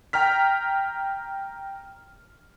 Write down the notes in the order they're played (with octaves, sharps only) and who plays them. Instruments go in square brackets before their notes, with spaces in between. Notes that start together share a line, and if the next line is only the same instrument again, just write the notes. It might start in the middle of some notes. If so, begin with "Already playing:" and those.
[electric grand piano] G5 A#5 F6 B6